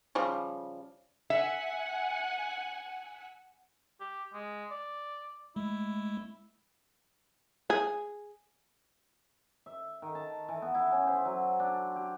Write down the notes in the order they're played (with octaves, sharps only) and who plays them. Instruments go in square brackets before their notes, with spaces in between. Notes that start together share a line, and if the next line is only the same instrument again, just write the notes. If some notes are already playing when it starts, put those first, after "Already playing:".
[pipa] C#3 F3 G3
[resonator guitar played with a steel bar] E5 [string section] F#5 G#5
[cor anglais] G4
G#3
D5
[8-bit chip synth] G#3 A3 [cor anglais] E4
[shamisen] G#4
[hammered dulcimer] E5
D#3
A5
E3
B3
E4
C#4
C5
F#3
D4
G4